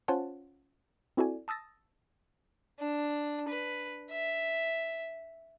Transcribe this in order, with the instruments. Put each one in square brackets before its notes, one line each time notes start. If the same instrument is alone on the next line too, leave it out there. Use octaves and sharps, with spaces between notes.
[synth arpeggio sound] C#4 F4 C5 C#5 F#5 A5
C4 E4 F#4 A4 D5 G#5
A5 D#6 E6 A6 A#6
[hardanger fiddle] D4
B4
E5